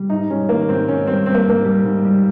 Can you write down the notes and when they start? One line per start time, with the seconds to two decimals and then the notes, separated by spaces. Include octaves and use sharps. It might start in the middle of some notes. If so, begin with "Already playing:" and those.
Already playing: G3
0.10 G#2 D#4
0.30 G3 C#4
0.49 D#3 A#3
0.68 G#2 C4
0.88 G#2 C#4
1.07 G3 C4
1.26 G3 C4
1.34 A#3
1.46 G#2 A#3
1.65 G3
1.84 G#2
2.05 G3